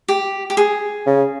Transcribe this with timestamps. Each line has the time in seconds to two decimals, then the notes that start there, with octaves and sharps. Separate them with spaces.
0.08 G4
0.50 G4
0.57 G#4
1.06 C#3